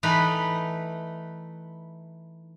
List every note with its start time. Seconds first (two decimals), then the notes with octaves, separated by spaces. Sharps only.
0.03 E3 A3 D#4 B4